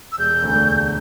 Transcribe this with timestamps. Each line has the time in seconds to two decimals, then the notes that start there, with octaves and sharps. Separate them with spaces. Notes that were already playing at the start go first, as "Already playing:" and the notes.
0.12 E6
0.18 E1 G6
0.42 D2 D3 A3
0.65 E1